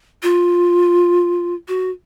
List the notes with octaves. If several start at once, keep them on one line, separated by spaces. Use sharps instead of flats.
F4
F#4